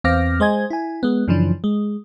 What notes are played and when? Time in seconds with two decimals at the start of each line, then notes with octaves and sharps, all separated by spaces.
0.04 E2 C4 F5 D6 F6 A#6
0.40 G#3 C5 D#5 G#5 G#6
0.70 E4 G#5
1.03 G#3 B3
1.28 F#2 C#3 E3 F3 D4
1.64 G#3